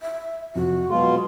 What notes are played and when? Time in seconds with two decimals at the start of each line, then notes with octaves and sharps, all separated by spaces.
0.02 E5
0.55 F2 C3 F#4
0.90 B2 F#3 G#3 F4
1.14 G#4